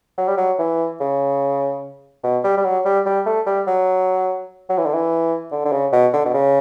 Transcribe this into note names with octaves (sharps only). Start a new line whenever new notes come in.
F#3
G3
F#3
E3
C#3
B2
G3
G3
F#3
G3
G3
A3
G3
F#3
F#3
E3
D3
E3
D3
D3
C#3
B2
D3
B2
C#3